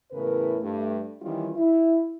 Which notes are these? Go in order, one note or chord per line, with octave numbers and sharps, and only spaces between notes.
E2 A2 C#3 A#4 B4
G2 A3
D#3 E3 G3 C#4 F4
E4